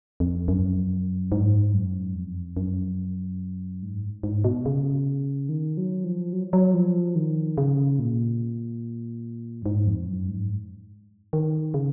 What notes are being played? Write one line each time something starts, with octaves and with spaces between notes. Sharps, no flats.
F2
F#2
G#2
F#2
F2
F#2
G#2
G#2
B2
C#3
D#3
F#3
F3
F#3
F#3
F3
D#3
C#3
A#2
F#2
G#2
F2
F#2
G#2
D#3
C#3